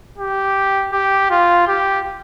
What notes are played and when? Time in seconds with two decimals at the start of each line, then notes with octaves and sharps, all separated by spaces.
0.18 G4
0.93 G4
1.30 F4
1.67 G4